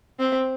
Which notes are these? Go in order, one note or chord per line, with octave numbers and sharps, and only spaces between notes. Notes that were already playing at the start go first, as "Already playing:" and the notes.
C4